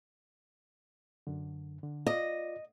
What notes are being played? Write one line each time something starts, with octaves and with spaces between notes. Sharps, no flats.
F#2 D3
D3
F4 D5 D#5